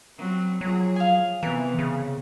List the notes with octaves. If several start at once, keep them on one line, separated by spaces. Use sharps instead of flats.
F#3 G3 C4
F3 F#3 G#4
F5 G#5
C3 E3 B3 C4 A#4
C#3